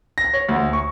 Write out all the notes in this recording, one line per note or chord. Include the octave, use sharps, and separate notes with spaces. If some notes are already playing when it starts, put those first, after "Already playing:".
A#6
C#5
D2
C#6